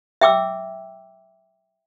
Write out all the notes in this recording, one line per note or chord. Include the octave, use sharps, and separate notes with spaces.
E5 G5 D6 E6